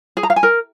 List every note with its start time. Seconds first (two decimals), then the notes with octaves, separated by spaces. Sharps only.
0.17 G#4
0.23 A#5
0.30 F5
0.36 G#5
0.43 A#4